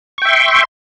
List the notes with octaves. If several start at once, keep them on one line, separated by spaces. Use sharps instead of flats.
E5 G5 C6 C#6